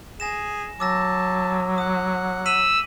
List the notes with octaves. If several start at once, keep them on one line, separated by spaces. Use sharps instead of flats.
G#4 G#5 A#6 E7
F#3 A5 D6 E6 A#6
F#5 D#6
E6 B6 D#7 F#7